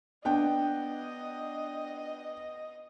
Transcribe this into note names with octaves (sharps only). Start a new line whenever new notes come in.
B3 D4 D#5 G5